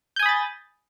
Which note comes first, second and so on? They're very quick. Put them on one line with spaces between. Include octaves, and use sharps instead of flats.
G6 G#5 D#6 B5 A6